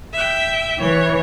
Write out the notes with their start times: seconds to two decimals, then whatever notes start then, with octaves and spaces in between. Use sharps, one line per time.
0.13 E5 G5
0.81 E3 C#5